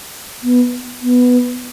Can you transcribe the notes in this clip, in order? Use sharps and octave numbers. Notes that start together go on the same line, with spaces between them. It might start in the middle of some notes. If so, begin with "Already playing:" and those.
B3
B3